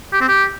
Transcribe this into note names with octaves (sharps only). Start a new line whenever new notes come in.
G4
C4
G4